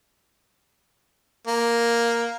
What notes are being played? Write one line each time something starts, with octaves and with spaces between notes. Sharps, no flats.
A#3